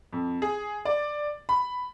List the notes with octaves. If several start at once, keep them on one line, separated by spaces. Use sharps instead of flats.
F2
G#4
D5
B5